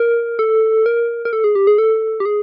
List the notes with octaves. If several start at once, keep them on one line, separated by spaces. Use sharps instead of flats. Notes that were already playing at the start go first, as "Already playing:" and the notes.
Already playing: A#4
A4
A#4
A#4
A4
G#4
G4
G#4
A4
G4
G#4